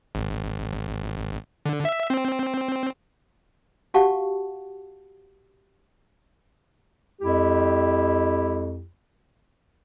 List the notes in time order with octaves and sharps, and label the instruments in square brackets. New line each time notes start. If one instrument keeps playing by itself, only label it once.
[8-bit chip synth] G#1
D3
E5
C4
[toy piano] F#4 G4 F5 F#5 A5 C#6
[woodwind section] F2 G#3 E4 G4